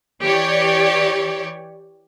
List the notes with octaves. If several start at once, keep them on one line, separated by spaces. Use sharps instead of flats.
E3 G4 C#5 D5